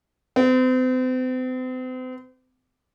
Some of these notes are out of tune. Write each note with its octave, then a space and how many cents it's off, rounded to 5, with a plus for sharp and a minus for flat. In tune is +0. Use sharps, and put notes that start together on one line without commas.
C4 -40